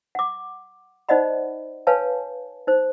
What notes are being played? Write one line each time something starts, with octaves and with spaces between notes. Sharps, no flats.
F#5 D6
D#4 C5 D5 D#5 F#5 B5
B4 C#5 F5 G#5 A5
D#4 C5